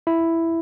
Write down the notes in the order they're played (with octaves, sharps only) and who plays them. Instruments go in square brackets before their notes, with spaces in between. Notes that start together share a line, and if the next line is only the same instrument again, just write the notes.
[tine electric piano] E4